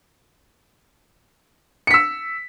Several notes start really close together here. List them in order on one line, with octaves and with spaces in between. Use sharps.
C#7 B6 E6